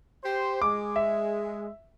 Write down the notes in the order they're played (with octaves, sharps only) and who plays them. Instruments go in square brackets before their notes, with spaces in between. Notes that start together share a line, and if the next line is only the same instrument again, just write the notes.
[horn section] G4 C5
[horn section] G#3 [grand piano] D6
[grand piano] E5